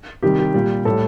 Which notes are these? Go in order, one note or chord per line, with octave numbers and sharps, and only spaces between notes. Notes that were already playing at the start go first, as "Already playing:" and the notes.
C3 D#3 G3 G4
G4
A#2 G3
A2 G3 A4